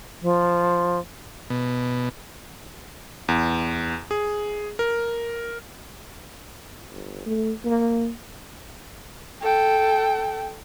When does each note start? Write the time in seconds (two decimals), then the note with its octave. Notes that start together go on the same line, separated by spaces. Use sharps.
0.22 F3
1.50 B2
3.28 E2
4.11 G#4
4.79 A#4
6.90 G1
7.26 A3
7.65 A#3
9.42 A4 G5